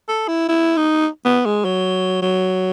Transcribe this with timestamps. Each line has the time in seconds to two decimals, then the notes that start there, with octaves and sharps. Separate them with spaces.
0.09 A4
0.28 E4
0.48 E4
0.77 D#4
1.25 B3
1.46 G#3
1.64 F#3
2.22 F#3